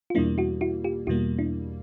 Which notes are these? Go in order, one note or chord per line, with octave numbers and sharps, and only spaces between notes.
F4
E2 B2 G3 A#3 D4 E4
E4 F#4
E4 F#4
F4 G4
E2 B2 G3 A#3 E4 F#4
D4 E4